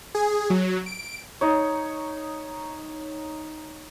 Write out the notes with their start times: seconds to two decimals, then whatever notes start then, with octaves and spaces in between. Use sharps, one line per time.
0.15 G#4
0.50 F#3
0.86 D7
1.41 D#4 C#5